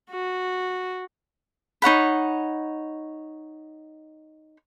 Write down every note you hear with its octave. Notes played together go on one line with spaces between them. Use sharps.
F#4
D#4 C#5 F#5 B5